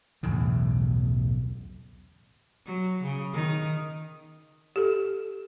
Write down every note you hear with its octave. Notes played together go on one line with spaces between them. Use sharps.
B1 E2 A2 C#3
F#3
C#3
D#3
G4 A4